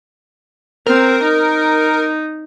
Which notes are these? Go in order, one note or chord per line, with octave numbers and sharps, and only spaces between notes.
C4 A#4
D#4